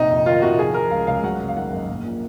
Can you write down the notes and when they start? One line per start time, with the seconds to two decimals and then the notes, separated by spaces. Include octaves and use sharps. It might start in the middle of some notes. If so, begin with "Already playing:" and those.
Already playing: A#1 C3 D#4
0.10 F2
0.26 D#3 F4
0.42 C3 F#4
0.59 F3 G#4
0.74 F3 A#4
0.91 C#2 F5
1.07 C#2 F5
1.23 F#3 F#5
1.40 F#1
1.48 F5
1.57 D#3 F#5
1.73 F#2
1.88 A#1
2.04 A#2